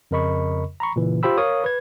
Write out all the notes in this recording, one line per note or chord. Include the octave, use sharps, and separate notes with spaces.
F2 C#3 A#4 D#5 B5 C#6
A#5 B5 C#6
A#2 C#3 E3
F4 G4 C5 G5 B5 E6
A#4 C#5 F5 C#6 D#6
B4 G#6